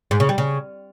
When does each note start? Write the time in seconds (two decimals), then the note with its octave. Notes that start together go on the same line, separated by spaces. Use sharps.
0.11 G#2
0.20 C#3
0.29 G3
0.38 C#3